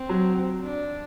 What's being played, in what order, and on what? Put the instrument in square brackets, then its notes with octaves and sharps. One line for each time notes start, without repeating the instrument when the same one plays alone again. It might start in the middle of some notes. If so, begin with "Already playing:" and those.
Already playing: [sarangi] C4
[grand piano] F#3
[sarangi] D4